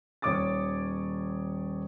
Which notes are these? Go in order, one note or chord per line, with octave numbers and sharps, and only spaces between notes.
D#1 D#3 C#5 D6 D#6 A6